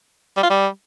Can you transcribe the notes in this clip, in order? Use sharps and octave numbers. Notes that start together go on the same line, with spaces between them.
G3
F4
G3